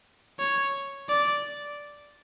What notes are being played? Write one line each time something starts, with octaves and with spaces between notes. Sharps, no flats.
C#5
D5